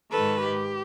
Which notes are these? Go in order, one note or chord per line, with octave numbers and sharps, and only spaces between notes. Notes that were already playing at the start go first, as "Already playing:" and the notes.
G#2 D#3 A4 B4
G4